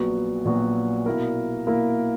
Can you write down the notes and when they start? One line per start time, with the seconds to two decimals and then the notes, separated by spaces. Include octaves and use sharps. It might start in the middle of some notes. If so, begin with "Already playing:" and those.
Already playing: A#1 A#2 F#3 B3 F#4
0.45 A#1 A#2 F#3 B3 F#4
1.06 B2 A#3 E4 A#4
1.67 B2 A#3 E4 A#4